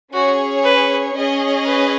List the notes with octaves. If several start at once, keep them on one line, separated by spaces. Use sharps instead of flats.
C#4 F#4 G#4 C#5
B4
C#4 G#4 D#5
B4